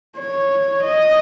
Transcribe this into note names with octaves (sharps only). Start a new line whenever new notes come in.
C#5
D#5